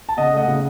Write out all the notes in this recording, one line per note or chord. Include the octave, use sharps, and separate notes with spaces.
A5
C#3 D#5 F#5
A3 D#5 F#5
C#3